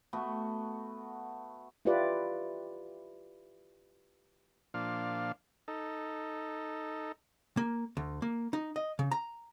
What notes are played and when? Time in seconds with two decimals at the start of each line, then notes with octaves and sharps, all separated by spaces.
0.13 A3 B3 F#4
1.85 E4 F4 G4 B4 D5
4.74 A#2 F3 D4 F5
5.68 D#4 A4
7.57 A#3
7.97 D2
8.22 A#3
8.53 D#4
8.76 D#5
8.99 C#3
9.11 A#5